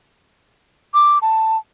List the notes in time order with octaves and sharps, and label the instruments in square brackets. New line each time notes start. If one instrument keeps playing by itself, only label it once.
[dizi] D6
A5